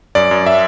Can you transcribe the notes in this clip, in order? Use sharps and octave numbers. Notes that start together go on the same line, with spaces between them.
F#2 D5
F#2
E5